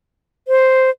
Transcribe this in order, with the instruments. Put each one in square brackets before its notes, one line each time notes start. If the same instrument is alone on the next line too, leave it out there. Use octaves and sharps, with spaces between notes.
[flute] C5